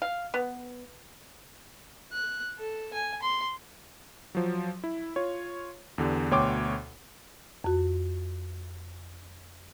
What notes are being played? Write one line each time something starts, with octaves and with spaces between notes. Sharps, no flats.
F5
B3
F#6
A4
G#5
C6
F3 F#3
E4
F4 C#5
E2 D3 G4
D2 B2 C#5 G5 C6 D6
F2 F#4